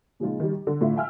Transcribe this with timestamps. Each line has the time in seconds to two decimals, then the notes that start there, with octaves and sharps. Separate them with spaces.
0.20 A#2 C#3 F3 G#3 D#4 F4
0.40 D#3 G3
0.51 G4
0.67 D3
0.81 A2 D3 F4 E5
0.96 E5 F5 G5 G#5 E6 F6